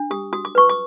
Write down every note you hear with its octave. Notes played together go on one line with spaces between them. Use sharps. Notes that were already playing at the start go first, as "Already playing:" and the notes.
Already playing: D4
G4 D#6
F#4 D#6
D6
B4 C#6
D6